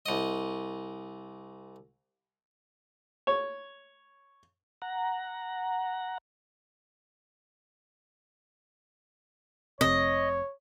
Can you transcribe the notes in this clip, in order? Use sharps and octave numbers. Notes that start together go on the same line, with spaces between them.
C2 D#5
C#5
F#5 A#5
F1 C3 C#5 D#5